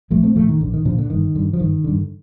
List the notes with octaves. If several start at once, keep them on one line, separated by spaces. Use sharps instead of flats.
A#1 F3 A3
A3 C4
A#2 F3 A3
D#3
A#1 D3
D#3
A#2 D3 F3
D3
G1 D#3
G2 D3
F3
G1 D#3
G2 D3